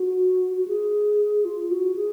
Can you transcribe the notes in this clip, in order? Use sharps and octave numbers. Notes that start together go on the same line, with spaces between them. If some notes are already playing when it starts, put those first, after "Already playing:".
Already playing: F#4
F#4
G#4
F4
F#4
G#4